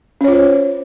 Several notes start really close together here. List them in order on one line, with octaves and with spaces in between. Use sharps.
C#4 C#5 F4 C5